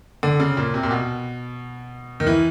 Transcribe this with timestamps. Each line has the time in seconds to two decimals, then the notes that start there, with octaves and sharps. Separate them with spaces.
0.23 D3
0.40 C#3
0.57 A#2
0.74 C3
0.83 A#2
0.91 B2
2.20 D#3
2.27 E3